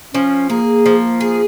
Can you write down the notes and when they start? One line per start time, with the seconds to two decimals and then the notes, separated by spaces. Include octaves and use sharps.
0.14 F3 C#4
0.50 A#3 G#4
0.86 F3
1.20 G#4